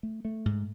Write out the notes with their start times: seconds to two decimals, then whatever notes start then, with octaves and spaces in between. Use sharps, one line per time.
0.03 A3
0.25 A3
0.46 G#2